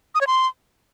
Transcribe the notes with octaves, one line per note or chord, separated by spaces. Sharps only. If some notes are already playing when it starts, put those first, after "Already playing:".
D#6
C#5
C6